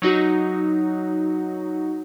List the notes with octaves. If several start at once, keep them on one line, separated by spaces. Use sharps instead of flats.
F#3 D#4 F#4